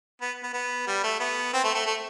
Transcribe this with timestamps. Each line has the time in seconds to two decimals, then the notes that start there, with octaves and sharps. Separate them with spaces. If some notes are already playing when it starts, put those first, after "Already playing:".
0.21 B3
0.43 B3
0.53 B3
0.87 G3
1.03 A3
1.20 B3
1.53 C4
1.64 A3
1.75 A3
1.86 A3